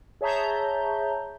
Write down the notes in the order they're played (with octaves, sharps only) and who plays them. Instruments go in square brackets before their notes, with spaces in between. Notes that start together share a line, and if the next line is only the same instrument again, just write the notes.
[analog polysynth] G#4 C#5 E5 A5 A#5 G6